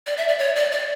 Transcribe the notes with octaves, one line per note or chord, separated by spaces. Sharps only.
D5
E5
D5
C#5
D5
D5